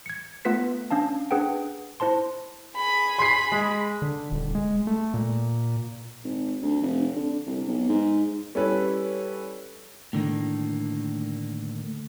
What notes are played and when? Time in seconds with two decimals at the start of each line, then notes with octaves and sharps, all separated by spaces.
0.06 G#6 C#7
0.45 A3 B3 F4 B4 B6
0.91 C#4 D4 F5 A5
1.31 D4 G#4 B4 F#5 G5
2.00 E4 C5 A5 C6
2.76 G#4 B5
3.19 C6 C7
3.52 G#3
4.02 D3
4.32 D#1
4.55 G#3
4.87 A3
5.14 A#2
6.24 G#1
6.62 D2
6.81 F1
7.16 D3
7.46 C2
7.67 B1
7.89 G#2
8.55 G3 C#4 E4 A4 B4 C#5
10.13 A2 D3 D#3 A#3